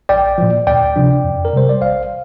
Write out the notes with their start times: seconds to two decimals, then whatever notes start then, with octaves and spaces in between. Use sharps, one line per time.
0.09 A#1 D5 G5
0.38 A#2 F3
0.67 D2 D5 G5
0.96 C3 F3 D4
1.24 F2
1.45 A#4
1.53 C3 G3 C5
1.69 D5
1.81 A#1 C5 F5